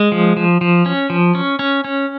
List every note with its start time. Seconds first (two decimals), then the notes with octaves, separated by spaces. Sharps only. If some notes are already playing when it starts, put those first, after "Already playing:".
Already playing: G#3
0.12 F3
0.37 F3
0.61 F3
0.86 C#4
1.10 F3
1.35 C#4
1.59 C#4
1.84 C#4